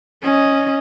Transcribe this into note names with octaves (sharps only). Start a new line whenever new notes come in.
C#4 D#5